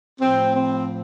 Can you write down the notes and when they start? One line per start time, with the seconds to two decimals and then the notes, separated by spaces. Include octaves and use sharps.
0.20 A2 F3 C4
0.54 C4